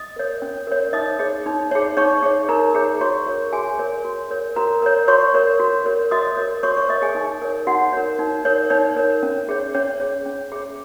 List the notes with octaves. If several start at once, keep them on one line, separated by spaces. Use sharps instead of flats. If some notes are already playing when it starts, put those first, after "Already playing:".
Already playing: D#5 D#6
A#4 C#5
C#4
A#4 C#5
D#4 D#5 D#6
G#4 C#5
D#4
G#4 C#5
D#4 C#5 C#6
G#4 C#5
D#4 A#4 A#5
G#4 C#5
F#4 C#5 C#6
A#4 C#5
F#4 G#4 G#5
A#4 C#5
F#4
A#4 C#5
F#4 A#4 A#5
A#4 C#5
F#4 C#5 C#6
A#4 C#5
F#4
A#4 C#5
F#4 D#5 D#6
A#4 C#5
F#4 C#5 C#6
C#5 C#6
A#4 C#5 D#5 D#6
G#4 G#5
D#4
A#4 C#5
D#4 F#4 F#5
A#4 C#5
D#4
A#4 C#5
D#4 C#5
A#4 C#5
C#4
G#4 C#5
C#4 C#5
G#4 C#5
C#4
G#4 C#5